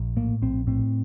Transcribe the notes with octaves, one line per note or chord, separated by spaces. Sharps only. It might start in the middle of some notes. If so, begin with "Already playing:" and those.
Already playing: A#1
A2 A#3
A#1 C4
A2 C4